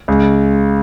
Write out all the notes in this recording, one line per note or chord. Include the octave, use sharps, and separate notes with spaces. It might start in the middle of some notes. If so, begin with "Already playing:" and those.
C#2